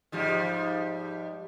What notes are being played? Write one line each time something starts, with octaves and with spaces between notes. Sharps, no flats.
G#2 F3 G3